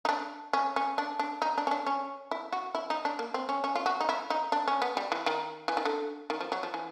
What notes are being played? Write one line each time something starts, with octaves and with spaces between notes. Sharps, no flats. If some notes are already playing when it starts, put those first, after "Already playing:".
D#4
D4
C#4
C#4
D4
D4
D#4
D4
C#4
D4
C#4
E4
F#4
E4
D#4
D4
A#3
C4
C#4
C#4
F4
F#4
D#4
E4
D#4
D4
C#4
B3
G3
E3
D#3
E3
D#3
D3
D#3
F3
F#3
F3
E3